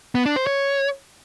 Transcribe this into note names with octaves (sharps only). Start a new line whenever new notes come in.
B3
D4
C5
C#5